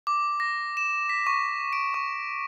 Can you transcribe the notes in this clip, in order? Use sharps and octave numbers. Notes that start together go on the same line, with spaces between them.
D6
A#6
E7
B6
C#6
D7
C#6